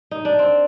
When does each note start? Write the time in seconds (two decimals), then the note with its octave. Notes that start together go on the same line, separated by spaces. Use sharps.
0.11 D#4
0.25 D4
0.39 C4